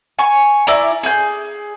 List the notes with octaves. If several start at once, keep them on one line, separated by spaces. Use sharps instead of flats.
G#5 C#6
E4 D5 A#5
G#4 G6